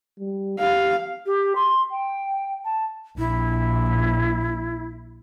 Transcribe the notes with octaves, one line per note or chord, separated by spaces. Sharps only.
G3
G4 F5
G4
C6
G5
A5
A#1 E4